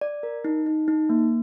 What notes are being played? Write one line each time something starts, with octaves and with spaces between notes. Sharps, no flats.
D5
A#4
D#4
D#4
D#4
A#3